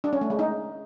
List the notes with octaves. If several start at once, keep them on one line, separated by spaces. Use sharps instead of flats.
D4
C#4
A3
G#3
D#4